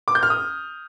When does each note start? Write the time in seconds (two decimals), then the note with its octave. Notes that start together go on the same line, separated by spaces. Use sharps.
0.08 D6
0.15 G6
0.23 F6
0.30 D#6